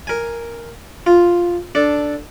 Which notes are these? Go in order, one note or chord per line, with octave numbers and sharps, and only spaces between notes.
A#4 G#5
F4
D4 A4